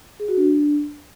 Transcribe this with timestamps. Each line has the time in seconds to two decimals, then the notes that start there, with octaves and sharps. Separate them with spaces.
0.20 G#4
0.28 F#4
0.37 D4